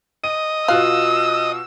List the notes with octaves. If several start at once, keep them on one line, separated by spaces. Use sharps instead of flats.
D#5 D#7
B2 F4 F5 E6 F#6